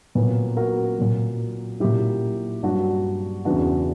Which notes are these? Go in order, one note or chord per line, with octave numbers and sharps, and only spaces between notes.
A#2 F#3 B3
F#4 A#4
A#2 F#3
A#2 F#3 E4 G4
G2 F#3 D4 F#4
E2 C#3 E3 D4 F#4